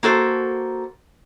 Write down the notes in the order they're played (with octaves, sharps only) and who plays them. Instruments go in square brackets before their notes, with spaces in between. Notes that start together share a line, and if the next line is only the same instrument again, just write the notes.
[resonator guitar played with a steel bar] A#3 F#4 A4 C5